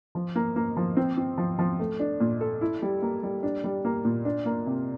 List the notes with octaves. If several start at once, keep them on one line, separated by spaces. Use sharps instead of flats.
F3
A#3
A#3
F3
C4
C4
F3
F3
A3
D4
A#2
A4
E4
G3
A#3
G3
D4
G3
A#3
A#2
D4
A#3
C3